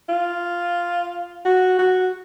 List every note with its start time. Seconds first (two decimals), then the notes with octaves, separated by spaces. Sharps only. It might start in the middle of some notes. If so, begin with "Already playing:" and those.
0.09 F4
1.45 F#4
1.79 F#4